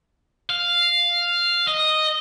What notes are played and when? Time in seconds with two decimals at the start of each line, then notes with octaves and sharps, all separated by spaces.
0.50 F5
1.67 D#5